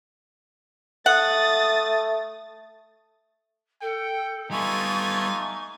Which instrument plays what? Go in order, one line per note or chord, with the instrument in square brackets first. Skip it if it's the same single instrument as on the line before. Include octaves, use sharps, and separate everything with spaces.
[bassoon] A3 [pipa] F#5 [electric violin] D#6 A6
[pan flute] A4 [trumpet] G5
[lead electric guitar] G3 B3 [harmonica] A3 F4 G#5 [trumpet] D#4 [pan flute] C#6